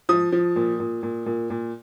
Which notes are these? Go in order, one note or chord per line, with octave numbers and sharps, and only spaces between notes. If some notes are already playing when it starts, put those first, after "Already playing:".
F3 D#6
F3
A#2
A#2
A#2
A#2
A#2